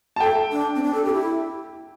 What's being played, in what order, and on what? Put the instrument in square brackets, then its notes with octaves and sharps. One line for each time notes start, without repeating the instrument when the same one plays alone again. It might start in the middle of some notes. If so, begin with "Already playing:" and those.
[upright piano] A5
[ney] A4 [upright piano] G5
[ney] D4
C4
D4
A4
G4
E4